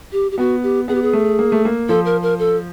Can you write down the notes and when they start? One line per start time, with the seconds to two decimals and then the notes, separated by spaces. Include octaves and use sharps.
0.12 G4
0.31 G4
0.38 B3 F#4
0.63 G4
0.88 B3 G#4
0.95 G4
1.02 G#4
1.13 A3
1.39 A#3
1.52 A3
1.65 A#3
1.89 F3 A4
2.05 A#4
2.23 A#4
2.39 A4